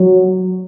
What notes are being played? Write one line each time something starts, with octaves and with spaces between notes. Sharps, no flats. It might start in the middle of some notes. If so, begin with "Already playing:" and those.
Already playing: F#3